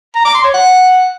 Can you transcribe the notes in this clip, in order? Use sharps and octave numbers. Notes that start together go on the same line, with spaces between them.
A#5
D6
C6
C#5
F#5